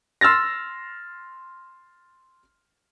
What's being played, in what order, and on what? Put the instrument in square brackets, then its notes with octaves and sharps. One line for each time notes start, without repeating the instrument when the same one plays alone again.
[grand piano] C6 E6 F6 A6 A#6